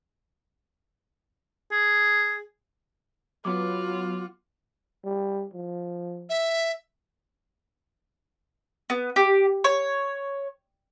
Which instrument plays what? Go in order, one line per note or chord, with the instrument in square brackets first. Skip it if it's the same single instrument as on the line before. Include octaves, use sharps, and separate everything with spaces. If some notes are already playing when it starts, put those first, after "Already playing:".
[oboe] G#4
[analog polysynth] F#3 B3 [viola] F4 F#4 [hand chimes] D6
[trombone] G3
F3
[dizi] E5
[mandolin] B3
G4
C#5